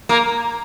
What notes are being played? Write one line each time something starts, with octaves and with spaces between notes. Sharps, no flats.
A#3